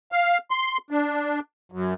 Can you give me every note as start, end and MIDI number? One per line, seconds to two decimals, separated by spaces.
0.12 0.38 77
0.51 0.77 84
0.91 1.40 62
1.72 1.94 42